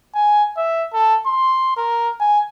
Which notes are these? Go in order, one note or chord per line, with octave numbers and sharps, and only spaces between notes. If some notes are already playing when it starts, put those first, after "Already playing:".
G#5
E5
A4
C6
A#4
G#5